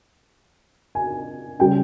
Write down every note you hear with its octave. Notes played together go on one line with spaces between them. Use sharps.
G#5
C#3 G3 C#4 G5